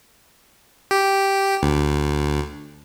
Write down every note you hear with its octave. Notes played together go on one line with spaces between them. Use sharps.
G4
D2